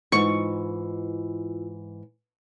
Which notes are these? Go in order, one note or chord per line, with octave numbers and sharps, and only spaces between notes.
G#2 E3 E4 F4 C#6